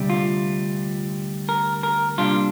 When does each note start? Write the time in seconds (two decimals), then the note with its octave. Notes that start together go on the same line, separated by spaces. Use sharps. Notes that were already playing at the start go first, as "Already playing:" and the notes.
Already playing: D2 C3 G3
0.10 F4
1.49 A#4
1.83 A#4
2.18 C3 G3 A#3 D4 F4